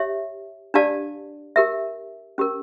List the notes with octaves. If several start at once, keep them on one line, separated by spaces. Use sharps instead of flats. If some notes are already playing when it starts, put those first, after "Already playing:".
Already playing: G4 C#5 E5
D4 G4 D5 F5 A5
G4 A#4 E5
C#4 G4 A#4